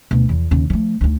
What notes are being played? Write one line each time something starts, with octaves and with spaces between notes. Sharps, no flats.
D2 B2
E2 F3
D#2 C#3
F3 A3
D2 D#4